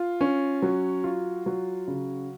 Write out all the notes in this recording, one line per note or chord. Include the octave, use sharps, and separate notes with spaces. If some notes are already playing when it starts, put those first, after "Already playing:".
Already playing: F4
C#4
F#3
F4
F#3
C#3